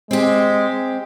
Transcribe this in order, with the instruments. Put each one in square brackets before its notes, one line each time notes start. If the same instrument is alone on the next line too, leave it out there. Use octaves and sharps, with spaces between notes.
[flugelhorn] G#3 [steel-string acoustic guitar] C4 G4